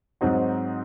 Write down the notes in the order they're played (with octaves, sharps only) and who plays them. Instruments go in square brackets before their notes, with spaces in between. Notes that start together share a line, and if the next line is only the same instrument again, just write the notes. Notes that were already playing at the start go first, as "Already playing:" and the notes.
[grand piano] G#2 F#3 C4 D#4 F#4